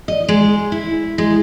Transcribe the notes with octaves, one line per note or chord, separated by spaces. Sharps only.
D#5
G#3
E4
G#3